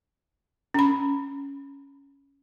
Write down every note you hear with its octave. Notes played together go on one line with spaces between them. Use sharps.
C#4 B5